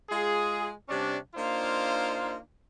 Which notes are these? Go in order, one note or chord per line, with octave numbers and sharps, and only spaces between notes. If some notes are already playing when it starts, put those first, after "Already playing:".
G#3 F4 G#4
C3 G3 C#4 D4
A#3 D4 D#4 F4 C5